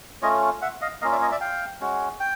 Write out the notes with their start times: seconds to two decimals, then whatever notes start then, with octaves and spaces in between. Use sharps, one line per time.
0.22 A3 C#4 F4 C#5 D#5
0.62 E5 F#5
0.82 D#5 F5
1.02 A#3 C#4 F4 D#5 F5
1.11 D5 E5
1.21 C#5 D#5
1.31 D5 E5
1.41 F5 G5
1.81 G#3 C#4 F#4
2.20 G5